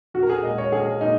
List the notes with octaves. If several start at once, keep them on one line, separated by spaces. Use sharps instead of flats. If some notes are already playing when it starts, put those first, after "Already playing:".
A#1 F#4
A#4
G#4
A#2 G#3 D#5
C#5
A#1 G#4
A#2 G#3 D#4